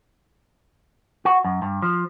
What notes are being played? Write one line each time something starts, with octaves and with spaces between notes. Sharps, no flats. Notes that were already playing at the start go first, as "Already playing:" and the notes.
F#4
F#2
G2
F3